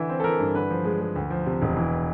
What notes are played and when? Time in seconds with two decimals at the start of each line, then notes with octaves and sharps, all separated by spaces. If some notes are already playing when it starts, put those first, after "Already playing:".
Already playing: D3 E3 E5
0.09 C4
0.20 A4
0.24 E3 A#4
0.40 G2
0.54 D3 B4
0.70 F3
0.85 G#3
1.01 G#3
1.16 D2
1.30 F3
1.46 C3
1.62 E1
1.77 E3